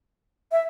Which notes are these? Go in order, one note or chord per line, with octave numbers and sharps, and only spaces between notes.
E5